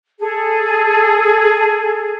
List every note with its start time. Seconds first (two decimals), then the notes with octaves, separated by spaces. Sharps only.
0.19 G#4 A4